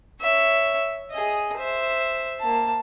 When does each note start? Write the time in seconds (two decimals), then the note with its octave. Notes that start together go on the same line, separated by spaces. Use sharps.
0.21 C#5 E5
1.12 G#4 D#5
1.58 C5 E5
2.40 A#3 A5